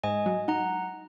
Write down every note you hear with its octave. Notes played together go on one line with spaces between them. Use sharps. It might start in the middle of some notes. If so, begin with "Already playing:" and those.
G#2 D#5 G#5
F#3
D#4 F#5 A#5